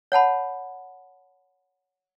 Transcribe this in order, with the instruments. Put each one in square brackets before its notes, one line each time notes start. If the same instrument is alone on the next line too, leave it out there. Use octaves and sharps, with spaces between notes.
[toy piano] C#5 F#5 A5 B5